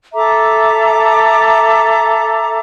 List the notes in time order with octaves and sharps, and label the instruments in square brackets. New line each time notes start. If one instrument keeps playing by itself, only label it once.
[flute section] A4 E5 A#5 D6